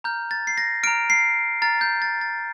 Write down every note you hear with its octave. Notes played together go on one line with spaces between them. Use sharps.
A#5 F6 G6
A6
C7
A#6
A#5 F6 D7
C7
A#5 F6 A6
G6
A6
A6